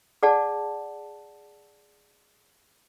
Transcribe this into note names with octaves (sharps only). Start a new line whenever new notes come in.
G#4 D5 F#5 A5